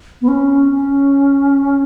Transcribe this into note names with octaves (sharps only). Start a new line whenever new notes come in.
B3
C#4
C#4